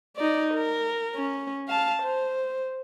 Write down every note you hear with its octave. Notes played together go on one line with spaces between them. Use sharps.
D#4 D5
A#4
C#4
F5 A5
C5